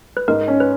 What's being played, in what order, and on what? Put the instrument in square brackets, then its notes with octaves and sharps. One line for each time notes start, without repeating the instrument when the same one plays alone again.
[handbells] B4
[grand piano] G#2 [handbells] A#4
[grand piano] C#4
[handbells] B4